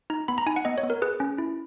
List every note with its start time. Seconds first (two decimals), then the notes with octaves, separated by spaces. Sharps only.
0.10 D#4 A#5
0.28 B3 B5
0.38 A#5
0.46 D#4 G#5
0.56 F#5
0.65 B3 D#5
0.78 C#5
0.83 B3
0.90 A#4
1.02 G#4 B4
1.20 C#4
1.38 E4